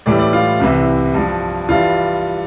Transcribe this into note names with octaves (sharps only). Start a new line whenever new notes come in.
A2 E3 G3 D5
D5
F4
C2 C3 E3
G2 F3
G2 E3 G3 F4